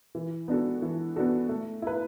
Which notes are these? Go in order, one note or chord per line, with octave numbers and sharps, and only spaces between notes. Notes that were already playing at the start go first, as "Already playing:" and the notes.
E3
B3 D4 F#4 A4
E3
B3 D4 F#4 A4
A3
E4 B4